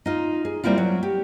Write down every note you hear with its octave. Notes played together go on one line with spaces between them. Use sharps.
D#4 F4
G#4
G3 A#3 C4 E4 F4
F#3
G4